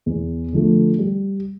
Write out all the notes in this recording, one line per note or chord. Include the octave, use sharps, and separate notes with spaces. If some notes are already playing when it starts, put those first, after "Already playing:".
E2
D3 F3 A3
G3